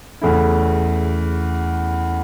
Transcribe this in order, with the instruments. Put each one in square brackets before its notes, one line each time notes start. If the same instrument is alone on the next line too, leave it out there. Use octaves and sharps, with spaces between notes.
[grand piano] E2 C#3 E3 A3 E4